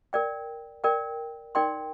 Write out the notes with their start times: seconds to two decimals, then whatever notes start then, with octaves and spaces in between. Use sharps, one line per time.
0.13 A#4 D5 G5
0.84 A#4 D5 G5
1.55 D#4 A#4 D5 G5 C6